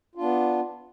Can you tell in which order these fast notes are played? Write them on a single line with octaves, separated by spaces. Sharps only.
F4 D4 B3